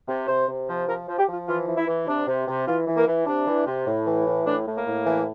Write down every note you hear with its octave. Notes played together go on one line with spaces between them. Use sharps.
C3
C3 C5
C3
F3
F3 A#4
F3
G4
F3
F4
E3 F4
E3
E4
E3
C3 D4
C3
C3
E3 F4
E3
A#3
E3
C3 D4
E3
C3
A2
E3
A2
A2 D4
A2
A#3
A2
E3